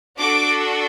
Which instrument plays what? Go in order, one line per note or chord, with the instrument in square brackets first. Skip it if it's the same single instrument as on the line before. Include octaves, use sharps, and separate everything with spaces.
[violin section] D4 F#4 A4 D6